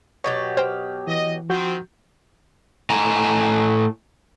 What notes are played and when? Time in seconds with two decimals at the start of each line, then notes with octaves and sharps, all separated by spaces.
0.24 B2 F#3 G4 C#5 A6
0.57 C5 G5 F6
1.07 E3 D#5
1.50 D#3 F3 C4 F#4 G6
2.90 A2 G#5 A#5